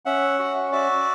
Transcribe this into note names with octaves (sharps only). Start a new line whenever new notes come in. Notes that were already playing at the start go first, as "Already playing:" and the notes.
C#4 E5 F#5
F#4
F#4 D5 E5